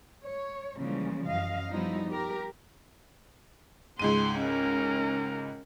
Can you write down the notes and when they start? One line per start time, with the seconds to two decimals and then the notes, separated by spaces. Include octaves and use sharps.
0.22 C#5
0.77 C#3 E3 F3 G3 G#3 A#3
1.26 F#2 D#5 F5
1.70 F3 G3 B3 D#4 E4
2.09 G4 A#4
3.99 C#2 G#2 C6 D#7
4.39 C#4 A#4